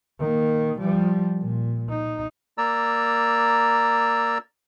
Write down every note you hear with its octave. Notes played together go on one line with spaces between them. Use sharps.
D#3 A#3
F3 G3
A#2
D#4
A#3 D5 A#5 E6